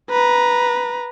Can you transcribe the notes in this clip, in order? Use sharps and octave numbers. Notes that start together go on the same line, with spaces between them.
B4 A#5